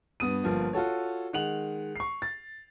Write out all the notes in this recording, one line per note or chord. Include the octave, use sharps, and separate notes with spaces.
G2 B3 D#6 D#7
G1 F3 A#3
F4 F#4 A4 C#5
D#3 G#3 F#5 F7 F#7
C#6 C7
A6